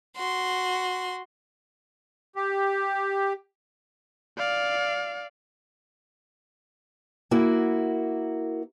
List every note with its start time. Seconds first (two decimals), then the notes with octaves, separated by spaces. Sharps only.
0.16 F#4 C6
2.36 G4
4.38 D5 F5
7.31 A#3 E4 F#4 A#4